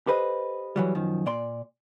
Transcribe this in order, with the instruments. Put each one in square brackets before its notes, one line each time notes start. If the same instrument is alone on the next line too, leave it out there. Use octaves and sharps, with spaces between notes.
[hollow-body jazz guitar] G4 A4 B4 C5 D#5
E3 F#3 G3
F#2 D#3 F3
A#2 D5 C6